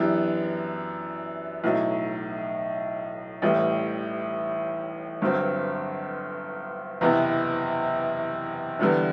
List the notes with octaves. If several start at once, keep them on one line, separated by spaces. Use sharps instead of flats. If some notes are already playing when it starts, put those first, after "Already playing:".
Already playing: F#2 E3 B3 D4 G4
B1 A2 F#3
A1 A2 E3 G3
G1 G2 F#3 C4
F#1 E2 C3 E3 B3
E2 D3 G3 B3 D4